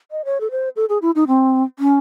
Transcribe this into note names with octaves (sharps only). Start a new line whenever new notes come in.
D#5
C#5
A4
C5
A4
G#4
E4
D#4
C4
C#4